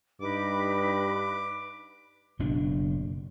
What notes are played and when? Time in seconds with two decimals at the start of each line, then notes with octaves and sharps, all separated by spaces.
0.21 G2 D#4 B4 B5 D6
2.39 F#1 B2 F#3 D4